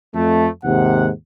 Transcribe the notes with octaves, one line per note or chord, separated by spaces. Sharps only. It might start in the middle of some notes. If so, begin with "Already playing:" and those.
F2 A3
D#2 G#2 C3 F#5